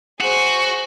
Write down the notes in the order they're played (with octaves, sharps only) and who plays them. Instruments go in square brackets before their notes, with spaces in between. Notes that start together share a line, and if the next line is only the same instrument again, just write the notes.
[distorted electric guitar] F#4 [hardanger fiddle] G#4 C5